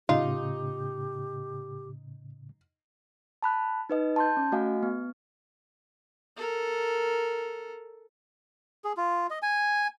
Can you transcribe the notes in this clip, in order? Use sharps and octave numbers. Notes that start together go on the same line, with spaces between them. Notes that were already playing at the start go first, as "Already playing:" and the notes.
A2 C#3 D#4 F4 G4
A5 B5 F#6
D#4 B4 D#5
A5 C6 G6
C#4
A3 F#4 D#5 F5 G#5
B3
A4 A#4
G#4
F4
D#5
G#5